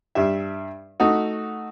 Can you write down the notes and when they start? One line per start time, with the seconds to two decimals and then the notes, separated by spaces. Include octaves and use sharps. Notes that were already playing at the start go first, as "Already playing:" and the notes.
0.15 G2 G3 E5
1.00 A3 D#4 F#4